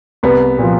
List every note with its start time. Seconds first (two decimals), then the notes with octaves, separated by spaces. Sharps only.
0.23 C2 B3
0.59 A#2 F3